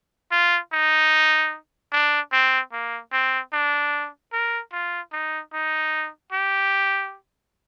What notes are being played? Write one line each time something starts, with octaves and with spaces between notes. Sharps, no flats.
F4
D#4
D4
C4
A#3
C4
D4
A#4
F4
D#4
D#4
G4